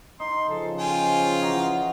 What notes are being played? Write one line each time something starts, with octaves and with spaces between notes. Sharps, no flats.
D#4 C6
C#3 F3 A4
F4 G5 G#5
E3 F#4 D#5 A#5